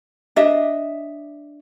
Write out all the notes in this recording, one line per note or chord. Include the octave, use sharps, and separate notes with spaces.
D4 D#5 E5